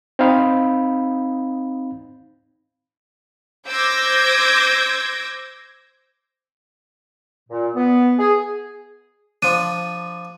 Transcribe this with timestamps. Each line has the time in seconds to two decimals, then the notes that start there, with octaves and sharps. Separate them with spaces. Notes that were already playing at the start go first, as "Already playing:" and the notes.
0.19 C4 D#4 F5 B5
3.68 C5 D6 E6 G6 G#6 A#6
7.49 A#2
7.75 B3
8.19 G#4
9.42 F3 D4 D#7